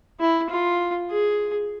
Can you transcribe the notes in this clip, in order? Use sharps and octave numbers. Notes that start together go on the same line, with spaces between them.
E4
F4
G#4